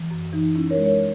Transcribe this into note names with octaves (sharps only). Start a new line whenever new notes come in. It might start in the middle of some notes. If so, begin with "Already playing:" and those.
Already playing: E3
F#2
E3 D#4
C#4 E4
A#4 C#5
G#3
A#4 C#5